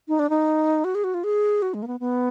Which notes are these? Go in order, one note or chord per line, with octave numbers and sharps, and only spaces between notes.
D#4
D4
D#4
F#4
G#4
F#4
F4
G#4
F#4
G#3
A#3
B3
B3